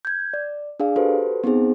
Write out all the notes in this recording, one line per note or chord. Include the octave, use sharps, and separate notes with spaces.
G6 G#6
D5
D4 G#4 D5 F5
F#4 G4 A4 B4 C5
B3 C4 D#4 G#4 C5